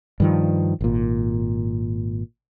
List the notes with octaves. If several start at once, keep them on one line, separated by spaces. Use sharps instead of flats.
G2 D#3 F3
G#1 A#2